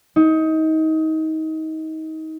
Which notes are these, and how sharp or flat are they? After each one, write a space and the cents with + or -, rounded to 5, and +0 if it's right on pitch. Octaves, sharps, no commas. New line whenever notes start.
D#4 +25